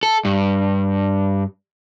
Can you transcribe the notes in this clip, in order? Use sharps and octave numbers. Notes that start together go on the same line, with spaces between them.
A4
G2